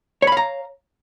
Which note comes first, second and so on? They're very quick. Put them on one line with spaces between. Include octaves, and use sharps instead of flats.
C#5 B5 F5 A#5